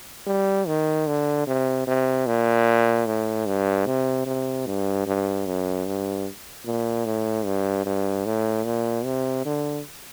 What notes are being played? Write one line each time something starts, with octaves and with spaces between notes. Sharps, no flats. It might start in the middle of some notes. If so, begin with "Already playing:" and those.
G3
D#3
D3
C3
C3
A#2
A2
G2
C3
C3
G2
G2
F#2
G2
A#2
A2
G2
G2
A2
A#2
C3
D3